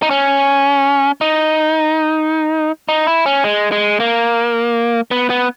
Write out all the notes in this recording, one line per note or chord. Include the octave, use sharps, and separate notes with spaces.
D#4
C#4
D#4
D#4
E4
C#4
G#3
G#3
A#3
B3
B3